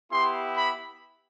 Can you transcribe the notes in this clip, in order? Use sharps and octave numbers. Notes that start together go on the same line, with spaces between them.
B3 E4 G4 C6
B5